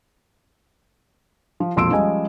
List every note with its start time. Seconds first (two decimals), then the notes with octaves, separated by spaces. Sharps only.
1.60 F3
1.76 E1 A#1 F2 C6 E6 D7
1.91 F3 G3 G#3 C#4 D#5 G#5